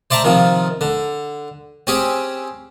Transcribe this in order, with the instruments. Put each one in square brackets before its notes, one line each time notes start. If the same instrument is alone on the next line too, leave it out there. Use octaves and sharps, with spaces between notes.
[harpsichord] C5 D5 E5 A5 A#5
C3 D#3 F3
D3
C4 C#4 G4 G#4